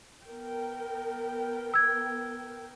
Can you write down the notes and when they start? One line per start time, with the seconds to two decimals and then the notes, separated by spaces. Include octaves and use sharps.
0.24 B3 A#4 G5
1.74 E6 G#6